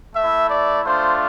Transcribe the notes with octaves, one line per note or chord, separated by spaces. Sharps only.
A3 E4 E5
D5
A3 D4 F4 C5